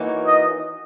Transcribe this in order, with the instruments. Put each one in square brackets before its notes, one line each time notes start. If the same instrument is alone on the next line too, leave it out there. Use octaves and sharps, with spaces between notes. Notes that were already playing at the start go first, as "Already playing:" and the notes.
Already playing: [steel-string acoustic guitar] E3 A#3 D#4 F#4 C#5
[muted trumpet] D#5